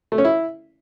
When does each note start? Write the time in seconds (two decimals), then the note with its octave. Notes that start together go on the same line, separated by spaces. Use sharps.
0.12 A3
0.18 C#4
0.25 E4